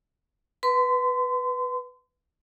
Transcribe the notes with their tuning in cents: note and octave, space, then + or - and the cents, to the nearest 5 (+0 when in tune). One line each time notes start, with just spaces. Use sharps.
B4 +0 C6 -35